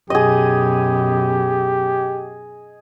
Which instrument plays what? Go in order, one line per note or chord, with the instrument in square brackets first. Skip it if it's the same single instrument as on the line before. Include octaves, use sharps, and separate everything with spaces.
[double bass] F#2 B2 [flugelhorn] G4 [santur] G#4 D#5